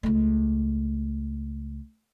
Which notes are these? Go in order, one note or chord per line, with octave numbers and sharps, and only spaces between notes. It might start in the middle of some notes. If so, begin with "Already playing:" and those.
C#2 A3